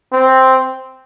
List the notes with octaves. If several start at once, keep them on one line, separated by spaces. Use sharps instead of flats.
C4